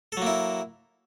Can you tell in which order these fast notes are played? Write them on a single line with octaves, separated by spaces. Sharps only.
A4 F#3 A#3 E4